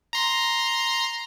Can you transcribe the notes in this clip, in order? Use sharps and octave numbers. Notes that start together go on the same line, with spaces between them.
A#5 C6